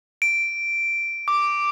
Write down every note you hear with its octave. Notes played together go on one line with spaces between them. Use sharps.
D7
D6